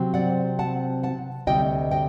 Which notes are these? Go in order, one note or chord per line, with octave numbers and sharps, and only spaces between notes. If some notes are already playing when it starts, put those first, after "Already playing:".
Already playing: C3 F#3 C4
D5 F#5
F#5 A5
F#5 A5
D2 C3 G3 D#5 G5
D#5 G5